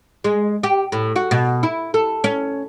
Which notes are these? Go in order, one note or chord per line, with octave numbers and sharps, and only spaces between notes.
G#3
G4
A2
F#4
B2
E4
A4
C#4